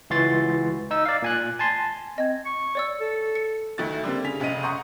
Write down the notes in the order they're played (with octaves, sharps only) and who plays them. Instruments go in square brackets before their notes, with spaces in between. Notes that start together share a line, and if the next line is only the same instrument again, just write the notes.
[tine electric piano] C#2 E3 F#4 C6 A6
D#4 E6
D5 F5
A#2 G#5 F#6
G#5 A5 C6
[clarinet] C4 [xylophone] D#5 G#6
[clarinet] C#6
[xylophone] C#5 D5 E6
[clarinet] A4
[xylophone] C#7
[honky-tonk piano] D2 D#3 A3 F#4 A6
D3 G3 A#3 C4
C#3 G#4 B6 F7
F1 A#1 C#3 D#5 D#7
F#5 A#5 C6 C#6 D#6 G6